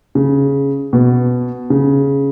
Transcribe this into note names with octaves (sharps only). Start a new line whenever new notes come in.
C#3
B2
C#3